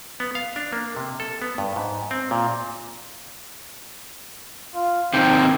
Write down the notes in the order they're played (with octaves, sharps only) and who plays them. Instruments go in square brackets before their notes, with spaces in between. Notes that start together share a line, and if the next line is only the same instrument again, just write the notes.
[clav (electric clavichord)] B3
F5
D4
A#3
C3
A4
B3
G2
G#2
C4
A#2
[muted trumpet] F4
[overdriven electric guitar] C3 D#3 [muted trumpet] C4 [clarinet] G5